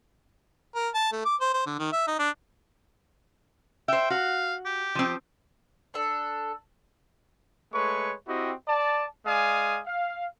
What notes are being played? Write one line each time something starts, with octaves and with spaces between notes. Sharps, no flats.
A#4
A5
A3
D6
C5
C5
D3
D#3
E5
D#4
D4
C5 E5 G5
F#4 F5
G4
F3 C4
D4 A4
G#3 A3 B4 C#5 C#6
C4 E4 F#4 G4 D#5
D5 A5
G#3 D5 F5 G#5 D#6
F5